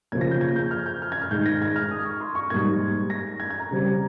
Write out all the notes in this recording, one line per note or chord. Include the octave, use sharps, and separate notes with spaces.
C#3 F3 A#3 C#4 G#6
A#6
G6
G#6
G6
F6
G6
F6
G#6
F6
G#2 D#3 G#3 G6
A#6
G#6
F6
D#6
C#6
C6
C#6
G#2 G3 A#3 G#6
A#6
G#6
G#6
A#5
C#3 G3 C4